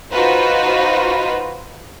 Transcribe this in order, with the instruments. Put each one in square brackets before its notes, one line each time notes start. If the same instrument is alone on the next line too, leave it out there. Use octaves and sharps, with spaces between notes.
[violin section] D#4 F4 F#4 B4 C5